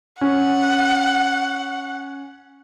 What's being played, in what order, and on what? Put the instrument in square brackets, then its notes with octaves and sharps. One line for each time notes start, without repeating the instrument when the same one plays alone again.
[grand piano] C#4 [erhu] F#5